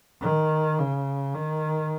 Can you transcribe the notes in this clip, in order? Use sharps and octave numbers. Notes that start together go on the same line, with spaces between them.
D#3
C#3
D#3